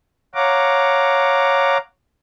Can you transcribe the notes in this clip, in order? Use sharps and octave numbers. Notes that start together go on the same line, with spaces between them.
C#5 F5 F#5 A#5 D6